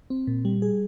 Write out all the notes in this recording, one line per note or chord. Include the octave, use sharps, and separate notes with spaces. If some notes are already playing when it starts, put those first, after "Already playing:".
C4
A#2
G3
G#4